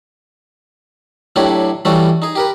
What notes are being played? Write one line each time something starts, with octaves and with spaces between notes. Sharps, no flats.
A2 F#3 D4 E4 G4 C#5
E3 G3 A3 C#4 F#4 A4
D#4 G#4
G4 A#4 B4